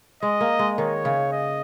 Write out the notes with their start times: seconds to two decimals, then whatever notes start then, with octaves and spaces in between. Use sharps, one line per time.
0.22 G#3 D#5
0.41 A#3
0.59 G#3
0.78 D#3 C#5
1.05 C#3
1.32 D#5